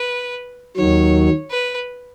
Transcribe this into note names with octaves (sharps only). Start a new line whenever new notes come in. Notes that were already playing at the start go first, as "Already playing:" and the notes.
Already playing: B4
D#2 D#3 F#3 C#5
B4